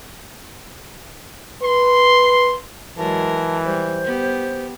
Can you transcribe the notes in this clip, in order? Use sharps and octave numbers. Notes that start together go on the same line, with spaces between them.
B4 C6
E3 F#3 G#3 A#4 A5
G3 C5
B3 G4